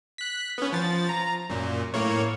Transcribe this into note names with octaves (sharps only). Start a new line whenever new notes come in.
F#6 B6
B3 C#4
F3 A6
A#5
F#2 A#2
A2 A#3 C#5